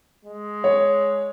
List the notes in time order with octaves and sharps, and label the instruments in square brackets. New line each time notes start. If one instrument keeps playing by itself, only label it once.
[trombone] G#3
[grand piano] C#5